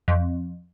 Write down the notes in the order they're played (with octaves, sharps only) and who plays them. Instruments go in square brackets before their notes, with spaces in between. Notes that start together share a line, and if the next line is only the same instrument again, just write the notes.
[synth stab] F2